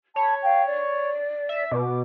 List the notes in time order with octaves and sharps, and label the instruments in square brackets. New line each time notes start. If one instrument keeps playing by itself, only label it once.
[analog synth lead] C#5 [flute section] A5 B5
[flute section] F5 G5
D5
[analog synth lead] E5
[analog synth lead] B2 [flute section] D6